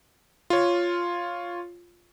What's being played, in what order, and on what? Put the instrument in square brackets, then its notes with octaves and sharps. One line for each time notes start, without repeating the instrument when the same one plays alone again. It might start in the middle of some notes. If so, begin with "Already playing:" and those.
[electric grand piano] F4 C#5